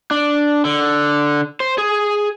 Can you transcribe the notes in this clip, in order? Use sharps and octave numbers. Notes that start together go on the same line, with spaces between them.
D4
D3
C5
G#4